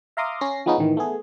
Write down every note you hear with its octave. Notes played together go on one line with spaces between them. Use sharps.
E5 F5 A#5 C6 D6 D#6
C#4 A#6 C7
F3 G#3 B3 C#4 D#4
A1 D#3 E3
A3 B3 G#4